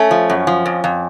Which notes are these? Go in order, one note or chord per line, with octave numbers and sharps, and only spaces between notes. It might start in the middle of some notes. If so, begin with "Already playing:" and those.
Already playing: A3 C#4
F3
F#2
F3
F2
F2